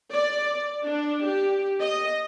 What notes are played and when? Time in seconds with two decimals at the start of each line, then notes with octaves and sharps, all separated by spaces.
0.11 D5
0.84 D4
1.25 G4
1.80 D#5